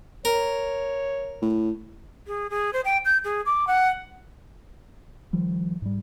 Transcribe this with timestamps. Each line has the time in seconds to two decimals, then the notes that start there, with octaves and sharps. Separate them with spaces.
0.25 A#4 C#5
1.42 A2
2.27 G#4
2.50 G#4
2.73 C5
2.85 G5
3.05 G6
3.24 G#4
3.46 D6
3.67 F#5
5.33 D#3 F3 G3
5.82 G#2 G3